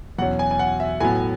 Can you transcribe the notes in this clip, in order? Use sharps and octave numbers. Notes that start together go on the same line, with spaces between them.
E2 B2 F#3 C#4 F#5
G#5
G#5
F#5
E5
A2 F#3 B3 G#5